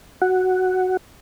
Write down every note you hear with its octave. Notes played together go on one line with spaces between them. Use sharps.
F#4 F#5